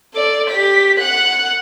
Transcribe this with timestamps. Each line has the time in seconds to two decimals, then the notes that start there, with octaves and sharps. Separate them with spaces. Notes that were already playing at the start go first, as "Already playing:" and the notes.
0.14 A4 D5
0.50 G4 B6
0.98 F#5 F#6